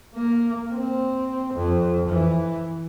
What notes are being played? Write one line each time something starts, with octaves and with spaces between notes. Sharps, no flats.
A#3
C4
F2
E3